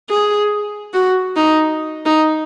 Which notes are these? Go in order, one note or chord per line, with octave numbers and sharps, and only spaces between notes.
G#4
F#4
D#4
D#4